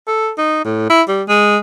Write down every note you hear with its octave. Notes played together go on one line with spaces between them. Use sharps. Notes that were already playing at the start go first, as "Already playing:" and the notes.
A4
D#4
A2
E4
G3
G#3